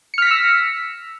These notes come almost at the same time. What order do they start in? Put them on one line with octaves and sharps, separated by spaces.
C#7 F6 B6 A#6 E6